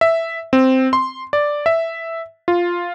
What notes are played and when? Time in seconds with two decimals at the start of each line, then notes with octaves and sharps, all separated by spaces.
0.01 E5
0.53 C4
0.93 C6
1.33 D5
1.66 E5
2.48 F4